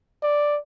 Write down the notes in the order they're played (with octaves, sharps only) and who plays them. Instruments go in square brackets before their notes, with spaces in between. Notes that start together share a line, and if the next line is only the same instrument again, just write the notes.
[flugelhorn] D5